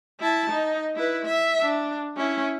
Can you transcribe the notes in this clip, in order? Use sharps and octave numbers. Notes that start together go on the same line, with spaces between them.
E4 A5
D#4
E4 B4
E5
D4
C#4 E4